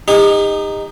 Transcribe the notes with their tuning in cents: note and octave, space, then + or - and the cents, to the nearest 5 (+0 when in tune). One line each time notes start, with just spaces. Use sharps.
D#4 -5 G4 +45